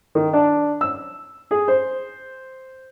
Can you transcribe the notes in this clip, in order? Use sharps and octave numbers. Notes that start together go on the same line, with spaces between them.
D#3
D4
E6
G#4
C5